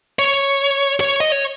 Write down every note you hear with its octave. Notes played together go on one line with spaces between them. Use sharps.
C#5
C#5
D#5
C#5